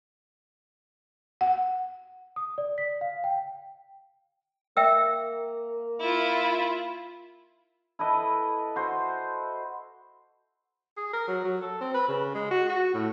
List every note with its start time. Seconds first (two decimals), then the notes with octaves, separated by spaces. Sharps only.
1.41 F#5
2.36 D#6
2.58 D5
2.78 B6
3.01 F5
3.24 G5
4.77 A#3 E5 G5 E6
6.00 E4 F4
7.99 E4 A4 B4 D#5
8.76 F#4 C5
10.97 G#4
11.13 A#4
11.28 F#3
11.44 F#3
11.61 A4
11.81 C4
11.94 B4
12.08 C#3
12.35 G#3
12.51 F#4
12.69 F#4
12.94 A2